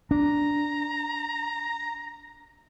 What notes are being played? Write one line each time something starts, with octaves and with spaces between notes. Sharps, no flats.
D4 A#5